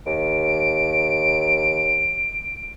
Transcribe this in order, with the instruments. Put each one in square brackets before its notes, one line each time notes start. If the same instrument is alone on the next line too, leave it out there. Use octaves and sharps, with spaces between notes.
[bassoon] D#2 [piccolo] D7